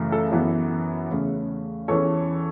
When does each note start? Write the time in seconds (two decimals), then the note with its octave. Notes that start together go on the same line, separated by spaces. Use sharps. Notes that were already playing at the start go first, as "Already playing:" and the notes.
Already playing: F#2 C#3 E3 A3
0.12 A4
0.32 F#2 E3 B3
1.10 E2 C#3 A3 C#4
1.88 E2 E3 C#4 A4 C#5